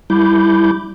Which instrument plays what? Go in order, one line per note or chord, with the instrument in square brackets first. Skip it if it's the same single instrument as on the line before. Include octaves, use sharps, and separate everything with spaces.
[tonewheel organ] G3 E4 B5 D6 G6